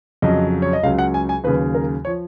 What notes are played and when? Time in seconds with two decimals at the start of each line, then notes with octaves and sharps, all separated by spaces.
0.22 F2 C#3 F#3 D#5
0.62 C#5
0.73 D#5
0.83 C#2 C#3 F#3 F5
0.99 F#5
1.14 G#5
1.29 G#5
1.44 D#2 C#3 F#3 B4
1.74 A#4
2.05 F3 C#5